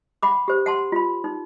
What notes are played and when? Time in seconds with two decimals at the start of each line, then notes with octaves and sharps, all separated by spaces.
0.23 F#5 B5 D6
0.48 G4 C5
0.66 F#5 A5 C6
0.92 F4 B5
1.24 D#4